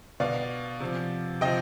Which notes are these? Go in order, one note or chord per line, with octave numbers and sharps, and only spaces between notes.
B2 D5 F5
C3 F3
C3 F3 D#5 G5